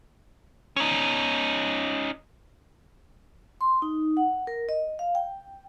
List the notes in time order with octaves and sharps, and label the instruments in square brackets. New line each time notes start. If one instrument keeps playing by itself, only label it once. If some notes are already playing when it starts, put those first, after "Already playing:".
[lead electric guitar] C#4 D#4
[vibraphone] C6
D#4
F#5
A#4
D#5
F5
G5